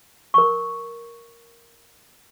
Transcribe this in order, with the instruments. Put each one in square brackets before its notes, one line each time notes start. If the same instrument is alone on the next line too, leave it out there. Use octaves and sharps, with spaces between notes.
[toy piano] A#4 C#6